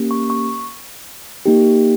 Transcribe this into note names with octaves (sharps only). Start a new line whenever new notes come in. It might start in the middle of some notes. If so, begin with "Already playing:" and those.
Already playing: A#3 C#4 G4
C#6
C#6
A#3 D#4 G4